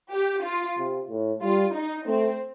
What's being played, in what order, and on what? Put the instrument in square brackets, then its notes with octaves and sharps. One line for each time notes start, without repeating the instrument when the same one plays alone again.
[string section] G4
F4
[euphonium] C3
A2
[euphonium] G3 [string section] F4
[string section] D#4
[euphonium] A3 [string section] C4